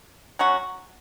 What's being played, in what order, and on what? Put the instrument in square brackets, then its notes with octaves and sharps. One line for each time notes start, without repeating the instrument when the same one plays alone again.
[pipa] F#3 C#4 F#4